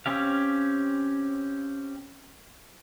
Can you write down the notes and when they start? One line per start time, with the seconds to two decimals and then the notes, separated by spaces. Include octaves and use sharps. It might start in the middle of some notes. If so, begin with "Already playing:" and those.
0.06 C4 C#4 G4 F5